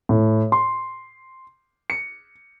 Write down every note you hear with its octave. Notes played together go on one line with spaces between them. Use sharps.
A2
C6
C#7